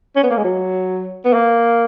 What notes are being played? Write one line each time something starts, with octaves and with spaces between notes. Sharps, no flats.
C#4
B3
A#3
G#3
F#3
B3
A#3